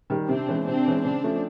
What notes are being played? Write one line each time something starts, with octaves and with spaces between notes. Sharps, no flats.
D#3 G3
C3 C4 D4
E3 G#3 C#4
C3 C4 D4
E3 G#3 C#4
C#3 C4 D4
F3 A3 C#4